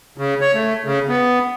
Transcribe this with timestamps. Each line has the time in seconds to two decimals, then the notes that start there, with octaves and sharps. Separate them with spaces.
0.18 C#3
0.41 C#5
0.53 A3
0.84 C#3
1.09 B3